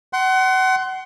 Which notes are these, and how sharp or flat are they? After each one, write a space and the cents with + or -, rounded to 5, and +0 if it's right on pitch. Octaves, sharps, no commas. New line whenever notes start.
F#5 +30 C6 +0